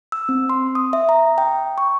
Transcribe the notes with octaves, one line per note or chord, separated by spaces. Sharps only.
E6
C4
C6
D#6
E5
A#5
G5
C#6